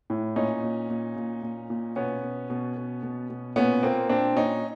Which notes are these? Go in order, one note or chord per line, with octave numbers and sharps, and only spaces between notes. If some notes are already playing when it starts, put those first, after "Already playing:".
A2
A#2 C#4 D#4
A#2
A#2
A#2
A#2
A#2
B2 B3 C#4
B2
B2
B2
B2
B2
A#2 B3 C#4
A#2 A#3 C4
A#2 C4 D4
A#2 C#4 D#4